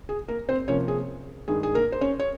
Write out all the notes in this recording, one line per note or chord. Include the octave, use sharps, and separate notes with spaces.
G#4
A#3 A#4
C4 C5
C3 F3 A#3 C#4 C#5
G#4
G2 D#3 G#3 G#4
G#4
A#3 A#4
C5
C#4 C#5
C#5